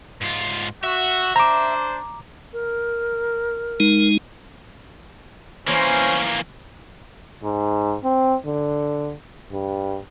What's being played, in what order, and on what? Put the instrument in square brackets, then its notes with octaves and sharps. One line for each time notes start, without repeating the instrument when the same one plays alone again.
[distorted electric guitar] G#2 F4
[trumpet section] F#4 [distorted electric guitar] E5
[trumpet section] D4 C5 [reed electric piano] A#5 D6
[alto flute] A#4
[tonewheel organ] G#3 D#4
[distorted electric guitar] E3 A#3 [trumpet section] C#4 C5
[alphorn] G#2
C4
D3
G2